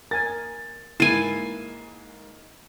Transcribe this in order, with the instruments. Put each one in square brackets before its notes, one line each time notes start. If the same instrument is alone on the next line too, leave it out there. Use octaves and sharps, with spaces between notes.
[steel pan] A#4 G#5 [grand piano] A6
[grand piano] G#2 A#3 C7 [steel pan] E4 [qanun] G#5 A5